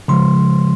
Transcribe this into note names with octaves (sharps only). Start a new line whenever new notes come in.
C#3 F3 G#3 C6